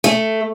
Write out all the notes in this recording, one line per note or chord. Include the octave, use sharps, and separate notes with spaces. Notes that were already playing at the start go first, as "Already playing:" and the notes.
A3